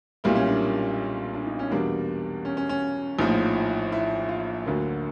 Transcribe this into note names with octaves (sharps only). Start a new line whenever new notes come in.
B1 A#2 G3 A#3 E4
C#4
D4
D4
D#4
C#4
E2 B2 G3 A#3 D4
C#4
C#4
C#4
A#1 A2 F3 D#4
E4
F4
D2 D3 F#3 A#3